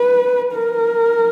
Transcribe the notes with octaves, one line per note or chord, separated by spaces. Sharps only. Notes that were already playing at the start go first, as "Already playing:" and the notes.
Already playing: B4
A#4